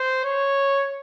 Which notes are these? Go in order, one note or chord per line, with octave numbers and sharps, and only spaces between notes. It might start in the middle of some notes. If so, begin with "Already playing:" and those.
Already playing: C5
C#5